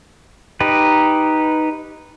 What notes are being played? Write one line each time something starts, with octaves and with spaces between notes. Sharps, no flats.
D#4 G4 B4